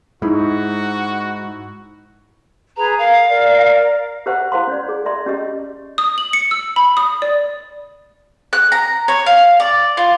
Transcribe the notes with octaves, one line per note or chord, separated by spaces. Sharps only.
G#2 D#4 E4 F#4
G#4 B4 A#5
A#4 F5
A#4 D5
G4 B4 C5 E5 F#5 C#6
E4 C5 F5 C6
C#4 C#5 D5
G#4
D5 E5 C6
C#4 G4 D#5
D#6
F#7
C#7
E6
B5
D#6
D5
F#6
A#5
C#5
F5
D5
F4